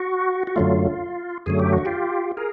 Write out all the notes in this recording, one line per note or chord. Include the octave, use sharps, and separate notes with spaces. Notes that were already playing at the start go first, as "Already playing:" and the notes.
Already playing: F#4
F#4
F#2 D3 F#3 A3 F4
F#2 D3 F#3 A3 G#4
G4
F#4
F4 G4
G#4 A#4